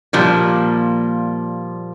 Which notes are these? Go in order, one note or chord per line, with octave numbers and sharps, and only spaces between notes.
A#2 F3 G3 A#3